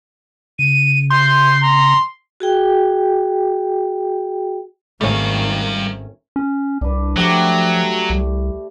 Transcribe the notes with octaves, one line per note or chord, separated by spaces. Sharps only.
C#3 D#7
C6 G6
A#5
F#4 G#4 G5
G#1 D#3 G3 A3 C#4 F5
C#4
C2 D4 B4
F3 F#3 A3 G4
C2